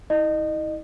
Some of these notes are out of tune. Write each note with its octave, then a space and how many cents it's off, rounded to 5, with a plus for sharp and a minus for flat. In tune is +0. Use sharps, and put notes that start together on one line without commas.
E4 -45 D#5 -25